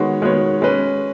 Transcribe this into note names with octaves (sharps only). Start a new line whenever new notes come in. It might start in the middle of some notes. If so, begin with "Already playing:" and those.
Already playing: D#3 G#3 B3 F#4 C#5
D#3 G#3 B3 F#4 C#5
G#3 C#4 B4